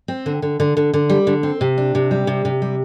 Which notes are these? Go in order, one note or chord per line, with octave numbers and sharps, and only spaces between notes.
C4
D3
D3
D3
D3
D3
G3
D3
C4
C3
D4
C3
G3
C3
C3
G3